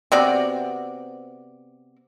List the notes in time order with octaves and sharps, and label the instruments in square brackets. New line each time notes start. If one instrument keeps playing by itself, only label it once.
[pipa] C3 B3 F#4 D5